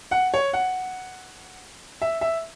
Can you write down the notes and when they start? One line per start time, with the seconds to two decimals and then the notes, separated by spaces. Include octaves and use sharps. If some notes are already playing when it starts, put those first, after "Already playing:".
0.11 F#5
0.34 C#5
0.53 F#5
2.02 E5
2.21 E5